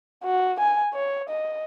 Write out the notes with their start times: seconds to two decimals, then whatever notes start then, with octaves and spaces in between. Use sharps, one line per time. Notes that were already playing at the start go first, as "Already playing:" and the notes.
0.24 F#4
0.60 G#5
0.93 C#5
1.29 D#5